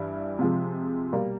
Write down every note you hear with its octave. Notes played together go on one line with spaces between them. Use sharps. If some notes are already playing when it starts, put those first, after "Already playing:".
Already playing: G2 E3 G3 E4
C3 F3 G#3
B2 G3 A#3